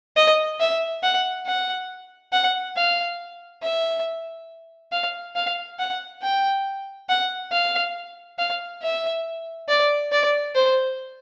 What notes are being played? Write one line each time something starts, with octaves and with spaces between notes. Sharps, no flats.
D#5
E5
F#5
F#5
F#5
F5
E5
F5
F5
F#5
G5
F#5
F5
F5
E5
D5
D5
C5